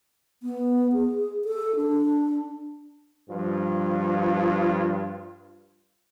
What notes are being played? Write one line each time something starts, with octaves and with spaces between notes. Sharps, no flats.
B3
G#4
A4
D4
G2 F3 F4